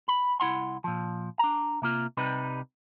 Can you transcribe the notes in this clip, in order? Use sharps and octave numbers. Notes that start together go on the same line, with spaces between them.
B5
C2 E4 F#5 C6
A#2 F3
D4 A#5
C3 A#3 F4
C2 C3 G3 D#4 B4